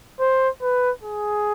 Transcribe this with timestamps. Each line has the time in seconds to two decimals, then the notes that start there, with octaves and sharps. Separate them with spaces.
0.20 C5
0.62 B4
1.03 G#4